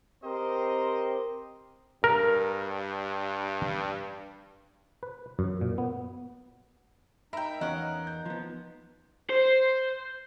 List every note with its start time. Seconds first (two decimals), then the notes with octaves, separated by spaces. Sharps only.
0.23 C4 G4 A#4 C5 D#5
2.04 G2 A#4
5.03 B4
5.39 F#2
5.61 A#2
5.78 B3
7.33 D#4 A#4 E5 G5 A#5 B5
7.61 E2 C#4 A#4 D#5 F5 F#5
8.07 G6
8.26 F3 B3
9.30 C5